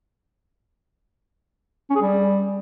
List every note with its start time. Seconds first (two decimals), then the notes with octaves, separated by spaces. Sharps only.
1.90 C#4
1.96 G#4
2.02 G3